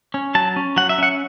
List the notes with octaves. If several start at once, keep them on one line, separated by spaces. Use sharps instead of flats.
C#4
F#3 A5
C#4
F#3 F#5
E5
C#4 F#5